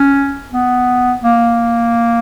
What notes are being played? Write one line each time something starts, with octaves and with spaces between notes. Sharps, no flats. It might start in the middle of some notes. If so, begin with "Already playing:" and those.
Already playing: C#4
B3
A#3